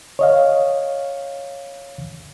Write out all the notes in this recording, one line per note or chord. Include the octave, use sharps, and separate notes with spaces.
C#5 D#5 F5